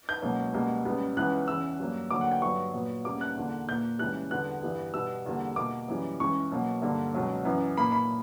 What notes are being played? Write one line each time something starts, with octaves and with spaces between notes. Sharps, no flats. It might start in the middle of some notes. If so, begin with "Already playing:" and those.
G6
C#2 B2 F#3 A#3
C#2 B2 G3 A#3
C#2 C#3 G3 B3
C#2 C#3 E3 B3 F#6
E2 C#3 E3 E6
G2 F#3 A#3
D2 D3 F#3 A#3 D6
F#5
G5
G2 F#3 B3 C#6
A#2 F#3 B3
D2 C#3 G3 A#3 D6
F#6
E2 D3 A#3
A#2 A#3 G6
C#2 C#3 E3 G3 F#6
E2 D3 G3 B3 F#6
G2 E3 G3 B3
B2 G3 B3 E6
E2 D3 G3 A#3
B2 A#3 D6
F#2 E3 G3
C#2 C#3 E3 C#6
B2 F#3 A#3
G2 D3 A#3
C#2 B2 F#3
F#2 E3 B3
A#2 A#3 B5
B5